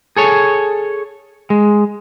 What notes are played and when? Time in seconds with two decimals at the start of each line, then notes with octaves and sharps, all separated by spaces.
0.16 G#4 A4 C#5
1.50 G#3